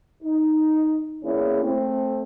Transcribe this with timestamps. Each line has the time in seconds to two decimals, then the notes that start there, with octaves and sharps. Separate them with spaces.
0.23 D#4
1.23 E2 A#3 C#4 E4 G#4
1.63 A3 C4